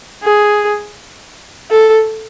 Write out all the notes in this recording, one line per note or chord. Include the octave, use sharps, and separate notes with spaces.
G#4
A4